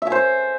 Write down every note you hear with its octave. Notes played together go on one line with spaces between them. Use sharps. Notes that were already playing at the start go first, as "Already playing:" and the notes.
E5
G#5
C5